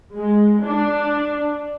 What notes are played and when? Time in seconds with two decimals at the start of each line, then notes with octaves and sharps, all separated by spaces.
0.16 G#3
0.65 D4